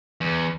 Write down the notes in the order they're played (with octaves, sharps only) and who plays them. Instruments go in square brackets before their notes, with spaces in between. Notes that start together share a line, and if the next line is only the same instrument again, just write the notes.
[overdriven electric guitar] E2